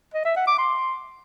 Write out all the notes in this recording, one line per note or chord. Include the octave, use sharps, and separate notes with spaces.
D#5
E5
F#5
D6
C6